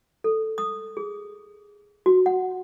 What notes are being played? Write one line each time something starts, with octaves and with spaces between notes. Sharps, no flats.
A4
D#6
G#4
F#4
F#5